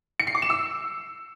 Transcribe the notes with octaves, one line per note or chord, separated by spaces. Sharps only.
C#7
C7
D6
E7
E6